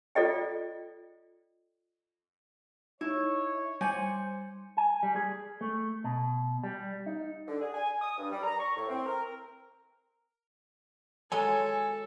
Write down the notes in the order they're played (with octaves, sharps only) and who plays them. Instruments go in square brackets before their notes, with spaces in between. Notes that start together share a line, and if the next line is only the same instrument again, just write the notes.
[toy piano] F4 A4 D5 D#5 G5
[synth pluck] D#4 [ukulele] E4 [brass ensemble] C#5
[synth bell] G3 G6 C#7 [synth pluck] C5 [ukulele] G#5
[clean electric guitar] G#5
G3
G#4
A3
B2
G3
D#4
[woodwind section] D3
G#4
G#5
D#6
G2
G3
A#5
C#6
A2
C4
A#4
[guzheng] F#3 G#3 [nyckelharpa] A4 [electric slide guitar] C#5 G#5